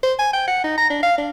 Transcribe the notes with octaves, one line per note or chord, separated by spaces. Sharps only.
C5
G#5
G5
F#5
D#4
A#5
D4
F5
D4